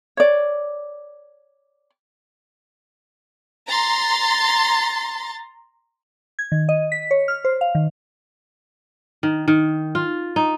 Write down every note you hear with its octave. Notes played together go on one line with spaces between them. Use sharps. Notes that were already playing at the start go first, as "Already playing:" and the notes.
C#5 D5
A#5 C6 A6
G#6
D#3
D#5
B6
C#5
F6
C5
F5
D#3
D#3
D#3
F4
D#4